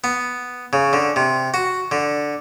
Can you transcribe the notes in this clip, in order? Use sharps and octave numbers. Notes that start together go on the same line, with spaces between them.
B3
C#3
D3
C3
F#4
D3